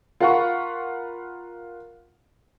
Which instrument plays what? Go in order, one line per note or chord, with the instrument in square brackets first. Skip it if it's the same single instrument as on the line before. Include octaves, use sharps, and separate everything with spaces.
[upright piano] F4 A#4 F5 F#5 B5 C#6